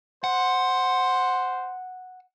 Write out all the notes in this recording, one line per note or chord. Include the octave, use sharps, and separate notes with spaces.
C5 F#5